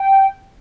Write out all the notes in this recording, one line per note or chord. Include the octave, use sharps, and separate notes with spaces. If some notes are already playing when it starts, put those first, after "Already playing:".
Already playing: G5